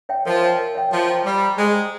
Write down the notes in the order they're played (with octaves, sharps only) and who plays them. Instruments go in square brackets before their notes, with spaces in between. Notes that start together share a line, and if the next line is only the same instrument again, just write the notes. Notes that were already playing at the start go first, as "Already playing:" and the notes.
[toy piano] C#5 E5 G5
[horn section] F3 [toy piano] A#4
[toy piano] C#5 E5 G5
A#4
C#5 E5 G5
[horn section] F3 [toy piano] C5
[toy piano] G5 A#5 C#6
[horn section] G3 [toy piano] C5
[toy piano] G5 A#5 C#6
[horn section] G#3 [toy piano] C5
[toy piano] G5 A#5 C#6